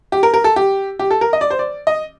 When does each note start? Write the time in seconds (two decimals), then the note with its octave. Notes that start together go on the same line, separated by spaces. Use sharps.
0.12 G4
0.23 A#4
0.34 A#4
0.44 A4
0.56 G4
0.99 G4
1.11 A4
1.21 A#4
1.33 D#5
1.41 D5
1.50 C5
1.59 D5
1.87 D#5